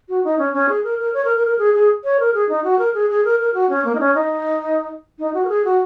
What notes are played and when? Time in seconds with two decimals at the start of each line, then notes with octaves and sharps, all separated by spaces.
0.09 F#4
0.25 D#4
0.39 C#4
0.53 C#4
0.69 G#4
0.84 A#4
0.99 A#4
1.14 C#5
1.25 A#4
1.37 A#4
1.47 A#4
1.59 G#4
1.74 G#4
2.04 C#5
2.20 A#4
2.34 G#4
2.49 D#4
2.64 F#4
2.79 A#4
2.94 G#4
3.10 G#4
3.25 A#4
3.40 A#4
3.54 F#4
3.70 C#4
3.85 A#3
3.95 D#4
4.00 C#4
4.15 D#4
5.19 D#4
5.34 F#4
5.45 A#4
5.49 G#4
5.65 F#4